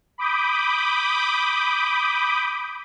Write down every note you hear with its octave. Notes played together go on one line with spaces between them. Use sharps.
B5 D6 D#6 G6